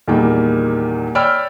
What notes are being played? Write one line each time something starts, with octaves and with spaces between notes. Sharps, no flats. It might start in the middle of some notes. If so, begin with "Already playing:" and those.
E2 A#2 D#3 G3 A#3
C#5 D5 G5 B5 E6 F6